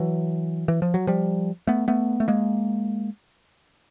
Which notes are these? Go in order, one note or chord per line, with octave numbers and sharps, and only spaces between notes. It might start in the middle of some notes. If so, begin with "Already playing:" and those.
Already playing: E3 F#3
E3
F3
F#3
F3 G3
A3 B3
A3 B3
A3
G#3 A#3